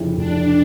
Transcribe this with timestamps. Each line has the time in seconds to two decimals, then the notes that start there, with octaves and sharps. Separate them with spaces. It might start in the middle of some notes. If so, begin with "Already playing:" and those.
Already playing: F1 F2 C#3 E3
0.17 F1 D4